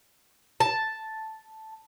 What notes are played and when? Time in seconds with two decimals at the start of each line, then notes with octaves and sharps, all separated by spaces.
0.60 A5